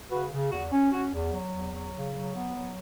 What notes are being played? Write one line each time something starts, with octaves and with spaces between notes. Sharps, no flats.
C#3 F#4 B4
C#3
E2 F#4
C#4
C#4 F#4
E2
F#3
E2
F#3
C#3
F#3
B3
F#3